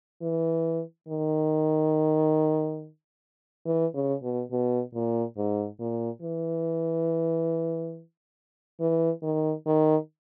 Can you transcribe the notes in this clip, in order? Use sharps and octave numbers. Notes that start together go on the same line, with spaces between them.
E3
D#3
E3
C#3
B2
B2
A#2
G#2
A#2
E3
E3
D#3
D#3